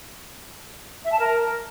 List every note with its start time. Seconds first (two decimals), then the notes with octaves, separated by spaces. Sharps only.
1.04 E5
1.12 A5
1.19 A#4